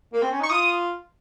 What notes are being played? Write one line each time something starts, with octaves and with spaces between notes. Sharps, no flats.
A#3
C4
C#4
D#4 C#6
F4 D#6